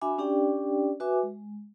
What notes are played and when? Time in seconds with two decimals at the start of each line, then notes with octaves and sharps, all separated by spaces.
0.01 D4 F#4 E5 G#5 B5 D6
0.18 C#4 D4 G4 D5 G5
1.00 F#4 B4 E5 G#5 D6
1.23 G#3